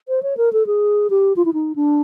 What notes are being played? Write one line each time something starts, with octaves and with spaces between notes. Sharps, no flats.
C5
C#5
A#4
A4
G#4
G4
F4
E4
D#4
D4